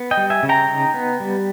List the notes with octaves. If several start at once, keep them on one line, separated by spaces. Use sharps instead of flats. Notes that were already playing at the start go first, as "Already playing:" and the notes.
Already playing: B3
D#5 G5
G3
E5 G#5
C#3
G5 A#5
D#4
B3
G3